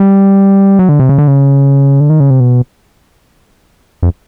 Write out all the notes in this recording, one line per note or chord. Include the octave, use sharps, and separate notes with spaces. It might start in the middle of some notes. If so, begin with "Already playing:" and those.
Already playing: G3
F#3
D3
C3
C#3
D3
C#3
D3
D#3
C#3
C3
B2
F2